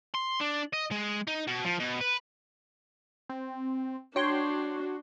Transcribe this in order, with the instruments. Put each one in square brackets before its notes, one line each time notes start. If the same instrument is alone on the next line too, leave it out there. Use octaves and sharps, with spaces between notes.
[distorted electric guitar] C6
D4
D#5
G#3
D#4
B2
F3
B2
B4
[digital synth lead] C4
[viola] D4 [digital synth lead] F#4 [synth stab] C#5 G5 C6